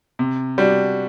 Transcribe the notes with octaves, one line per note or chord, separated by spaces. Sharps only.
C3
G3 D4 F#4